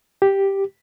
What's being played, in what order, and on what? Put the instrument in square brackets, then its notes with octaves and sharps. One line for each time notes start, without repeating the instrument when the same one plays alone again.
[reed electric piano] G4